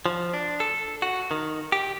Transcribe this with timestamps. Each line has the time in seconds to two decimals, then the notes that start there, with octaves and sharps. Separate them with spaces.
0.06 F3
0.34 D4
0.60 A4
1.02 F#4
1.31 D#3
1.72 G4